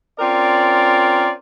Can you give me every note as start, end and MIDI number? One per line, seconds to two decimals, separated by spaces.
0.20 1.30 60
0.20 1.30 61
0.20 1.30 65
0.20 1.30 70
0.20 1.30 74